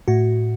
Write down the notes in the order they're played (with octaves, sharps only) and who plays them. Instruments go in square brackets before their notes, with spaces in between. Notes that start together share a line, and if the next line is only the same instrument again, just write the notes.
[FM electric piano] A2 F#4